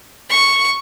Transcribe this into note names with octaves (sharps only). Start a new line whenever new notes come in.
C#6